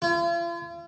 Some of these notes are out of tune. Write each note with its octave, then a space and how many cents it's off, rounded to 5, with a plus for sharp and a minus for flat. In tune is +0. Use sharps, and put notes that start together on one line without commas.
F4 -45